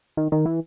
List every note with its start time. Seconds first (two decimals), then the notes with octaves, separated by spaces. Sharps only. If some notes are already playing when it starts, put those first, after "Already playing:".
0.17 D#3
0.32 D#3
0.46 E3